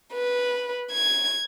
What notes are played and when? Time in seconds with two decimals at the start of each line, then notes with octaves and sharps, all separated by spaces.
0.13 B4
0.93 G#6